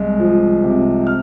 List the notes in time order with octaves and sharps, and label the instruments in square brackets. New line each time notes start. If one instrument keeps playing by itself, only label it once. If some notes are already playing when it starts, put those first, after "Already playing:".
Already playing: [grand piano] C2 G#3
F3
C3
F6